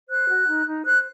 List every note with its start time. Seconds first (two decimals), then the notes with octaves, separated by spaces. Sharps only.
0.10 C5 F#6
0.30 F#4
0.49 D#4
0.67 D#4
0.86 C5 F#6